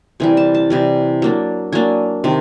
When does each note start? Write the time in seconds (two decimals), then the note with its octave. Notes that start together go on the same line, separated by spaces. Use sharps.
0.20 C3 E3 G3 G#5
0.37 A5
0.54 A5
0.70 C3 E3 G3 G#5
1.22 F#3 A#3 D4
1.73 F#3 A#3 D4 G#5
2.24 C3 D#3